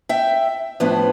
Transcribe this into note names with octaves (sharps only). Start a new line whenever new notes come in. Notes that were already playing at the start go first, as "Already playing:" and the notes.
E5 G5
A2 F3 B3 D4